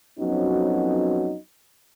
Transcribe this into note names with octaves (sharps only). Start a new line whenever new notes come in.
F2 F#3 B3 C#4 D#4 F#4